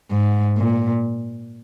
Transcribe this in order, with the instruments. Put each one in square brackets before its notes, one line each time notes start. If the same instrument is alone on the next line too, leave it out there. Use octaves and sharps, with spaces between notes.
[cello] G#2
A#2